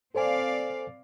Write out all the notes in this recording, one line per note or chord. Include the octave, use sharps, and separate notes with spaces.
C4 A4 C5 D5 F5 G#5